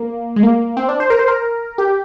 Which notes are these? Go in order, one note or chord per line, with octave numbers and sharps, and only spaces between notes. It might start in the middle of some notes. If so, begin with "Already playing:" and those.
Already playing: A#3
G#3
A#3
C4
D4
C5
A#4
C5
A#4
G4